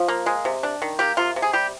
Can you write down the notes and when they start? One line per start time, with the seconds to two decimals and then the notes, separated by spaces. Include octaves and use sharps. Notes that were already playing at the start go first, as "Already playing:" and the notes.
Already playing: F3
0.08 A#3
0.26 G#3
0.45 C3
0.63 D4
0.82 D#3
0.99 A#3 G4
1.17 C3 F4
1.36 C3
1.42 G#4
1.53 G3 G4